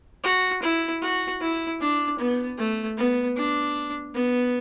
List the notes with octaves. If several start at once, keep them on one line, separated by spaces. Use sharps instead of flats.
F#4
E4
F#4
E4
D4
B3
A3
B3
D4
B3